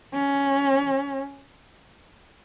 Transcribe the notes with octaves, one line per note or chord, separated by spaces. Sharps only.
C#4